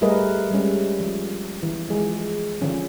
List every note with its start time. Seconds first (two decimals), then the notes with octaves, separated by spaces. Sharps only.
0.01 G3 A3 G#4 A#4 B4 D#5
0.51 G3 G#3 C#4
1.00 F3
1.63 E3
1.88 E3 F3 G#3 G#4
2.62 D3 F3 C#4